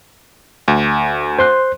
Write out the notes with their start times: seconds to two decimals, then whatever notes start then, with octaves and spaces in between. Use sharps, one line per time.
0.68 D2
1.39 C5 C6 F#6